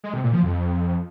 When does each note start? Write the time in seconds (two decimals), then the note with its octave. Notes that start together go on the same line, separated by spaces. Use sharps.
0.04 G#3
0.13 C3
0.23 A#2
0.33 F3
0.43 F2